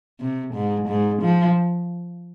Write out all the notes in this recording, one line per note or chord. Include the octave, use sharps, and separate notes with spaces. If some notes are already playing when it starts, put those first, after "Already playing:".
C3
G#2
G#2
F3